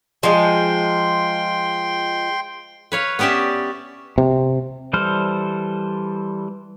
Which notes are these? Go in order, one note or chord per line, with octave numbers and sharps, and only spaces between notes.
F3 G#3 G5 C6
B4 C#5 F5
B3 C#4 G4 D5 E5
C3
E3 G3 A4 C5 F6